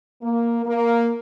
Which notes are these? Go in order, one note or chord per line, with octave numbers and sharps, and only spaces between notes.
A#3
A#3